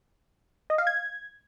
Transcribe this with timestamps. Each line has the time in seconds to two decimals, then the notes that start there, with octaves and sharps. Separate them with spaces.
0.70 D#5
0.78 F5
0.87 G#6